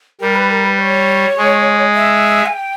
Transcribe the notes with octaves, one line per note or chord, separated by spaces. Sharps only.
G3 A#4
B4
A#4
B4
C#5
G#3
E5
G#5
G5